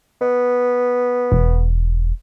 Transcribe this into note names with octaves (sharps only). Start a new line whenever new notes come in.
B3
E1